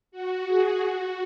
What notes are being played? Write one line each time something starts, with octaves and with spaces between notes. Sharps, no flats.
F#4
G#4
F#4